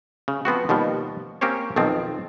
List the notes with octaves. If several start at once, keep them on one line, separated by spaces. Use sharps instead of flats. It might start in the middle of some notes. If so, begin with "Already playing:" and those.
C#3
F3 B3 C4 F#4
D#2 B2 F3 G3
A#3 C4 C#4 G4 C5 C#5
B1 F2 D#3 F3 C4